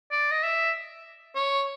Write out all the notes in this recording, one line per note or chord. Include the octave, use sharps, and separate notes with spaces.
D5
D#5
E5
C#5